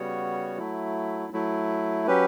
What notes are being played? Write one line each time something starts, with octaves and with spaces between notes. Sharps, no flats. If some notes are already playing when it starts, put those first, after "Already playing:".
Already playing: C#3 G3 B3 F#4 C#5
F#3 A3 E4
F#3 A3 E4
F#3 C#4 G4 B4